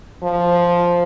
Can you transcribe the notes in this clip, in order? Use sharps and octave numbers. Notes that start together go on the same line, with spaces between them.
F3